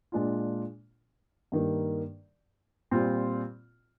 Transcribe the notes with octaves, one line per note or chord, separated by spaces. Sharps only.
A#2 G#3 D4 F4
G2 D#3 A#3
A#2 G3 C4 F4